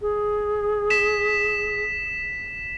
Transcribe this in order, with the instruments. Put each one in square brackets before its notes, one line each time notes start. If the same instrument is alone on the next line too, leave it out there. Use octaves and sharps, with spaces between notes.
[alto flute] G#4
[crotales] B6 E7